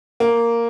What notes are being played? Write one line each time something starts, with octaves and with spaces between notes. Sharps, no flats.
A#3